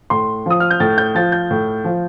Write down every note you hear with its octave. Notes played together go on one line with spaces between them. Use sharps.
A2 C6
F3 D#6
F6
G6
A2 A6
G6
F3 A6
G6
A2
F3